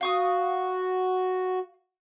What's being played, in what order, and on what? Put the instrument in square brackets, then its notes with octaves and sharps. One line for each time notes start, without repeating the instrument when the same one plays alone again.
[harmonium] F#4 [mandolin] F5 C#6 D#6